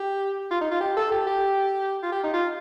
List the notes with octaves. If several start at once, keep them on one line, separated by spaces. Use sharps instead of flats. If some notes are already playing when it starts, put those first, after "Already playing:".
Already playing: G4
F4
D#4
F4
G4
A4
G4
G4
F4
G4
D#4
F4